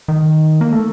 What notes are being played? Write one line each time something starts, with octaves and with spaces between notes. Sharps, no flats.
D#3
A#3
A3